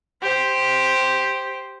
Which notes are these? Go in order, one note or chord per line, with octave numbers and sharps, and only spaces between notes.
G4 C5